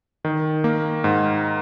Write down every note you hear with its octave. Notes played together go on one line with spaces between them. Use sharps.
D#3
A#3
G#2